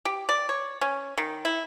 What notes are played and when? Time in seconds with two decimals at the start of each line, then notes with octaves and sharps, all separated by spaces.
0.05 G4
0.29 D5
0.49 C#5
0.81 C#4
1.18 D#3
1.45 E4